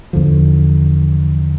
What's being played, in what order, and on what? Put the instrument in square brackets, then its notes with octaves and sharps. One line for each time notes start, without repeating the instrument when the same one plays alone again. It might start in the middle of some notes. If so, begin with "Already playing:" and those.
[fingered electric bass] E2 D3 F3